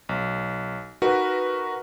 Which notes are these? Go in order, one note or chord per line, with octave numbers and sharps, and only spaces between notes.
B1
D#4 F#4 A#4 B4